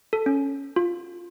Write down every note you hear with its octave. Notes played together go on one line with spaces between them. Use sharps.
A4
C#4
F4